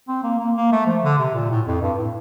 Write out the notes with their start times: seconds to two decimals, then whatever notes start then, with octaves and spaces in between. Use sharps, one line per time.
0.08 C4
0.24 A#3
0.39 A#3
0.56 A#3
0.72 A3
0.87 F3
1.03 D3
1.19 C3
1.34 A#2
1.50 A2
1.67 F2
1.82 G2
1.98 A2